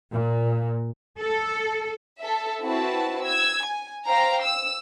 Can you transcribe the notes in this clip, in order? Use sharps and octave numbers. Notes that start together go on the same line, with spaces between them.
A#2
A4
A4 E5
C4 E4 F#4 B4 A5
E6 G#6
G#5
C5 F5 G5 A#5
E6